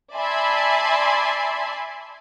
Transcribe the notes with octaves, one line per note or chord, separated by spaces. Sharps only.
D5 E5 G#5 A5 B5 C6